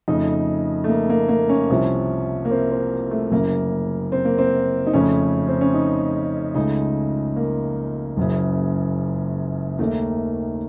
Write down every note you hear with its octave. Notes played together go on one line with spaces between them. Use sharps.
F2 C#3 A3 D#4
A3
A#3
A#3
A#3
C#4
C2 C3 F3
A#3
C4
C4
A3
F#1 F#2 C#3 A#3
C4
A#3
C4
D#4
F2 C#3 A3 C#4
C4
C#4
D#4
C#2 C#3 A3 D#4
A#3
F#1 F#2 C#3
D#2 D#3 A3 A#3